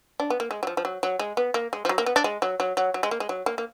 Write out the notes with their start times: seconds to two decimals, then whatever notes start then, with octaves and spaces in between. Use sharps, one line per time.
0.20 D4
0.30 B3
0.40 A#3
0.51 G#3
0.63 F#3
0.67 F3
0.77 F3
0.85 F#3
1.03 F#3
1.19 G#3
1.37 B3
1.54 A#3
1.73 G#3
1.85 F3
1.89 F#3
1.98 A#3
2.06 B3
2.16 D4
2.24 G#3
2.42 F#3
2.60 F#3
2.77 F#3
2.94 F#3
3.03 G#3
3.11 A#3
3.20 G#3
3.29 F#3
3.46 A#3
3.58 A#3